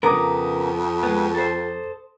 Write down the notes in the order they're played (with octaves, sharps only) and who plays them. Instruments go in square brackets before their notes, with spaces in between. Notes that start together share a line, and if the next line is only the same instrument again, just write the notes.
[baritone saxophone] F2 [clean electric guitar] C#3 B3 A#4 [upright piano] A#5 D6 D#6
[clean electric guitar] G#3 B3
A4 C5